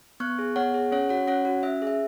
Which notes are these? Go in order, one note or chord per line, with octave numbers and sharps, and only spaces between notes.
B3 C#6 F#6
G#4
B3 C#5 F#5
G#4
C#4 C#5 F#5
F#4 C#5 F#5
C#4 C#5 F#5
F#4
C#4 E5
G#4 E5